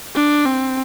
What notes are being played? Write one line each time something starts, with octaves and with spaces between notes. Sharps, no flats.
D4
C4